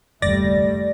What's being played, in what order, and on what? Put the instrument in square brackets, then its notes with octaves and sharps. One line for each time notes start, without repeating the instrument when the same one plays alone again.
[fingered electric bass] F#1 D#2 [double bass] G3 A3 [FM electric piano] D5 A6 A#6